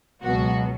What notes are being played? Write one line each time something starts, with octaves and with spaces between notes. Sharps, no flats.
C#2 B2 F#3 F#4